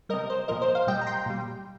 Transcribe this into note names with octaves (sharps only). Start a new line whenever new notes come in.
C3 G3 A#4 D#5
C5
A#2 F3 A#4 D#5
C5
C5 F5
A#2 G3 D#5 G5
A#5
G5 C6
A#2 G3